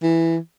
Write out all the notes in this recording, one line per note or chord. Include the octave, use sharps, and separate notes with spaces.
E3